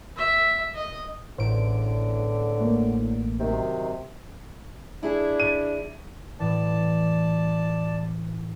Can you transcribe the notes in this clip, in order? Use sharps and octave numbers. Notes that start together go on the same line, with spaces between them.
E5
D#5
A1 E2 A2 D3 C5 D7
A3 A#3
F#2 C3 D#3
D4 E4 G#4
D#7
A2 E3 D5 A5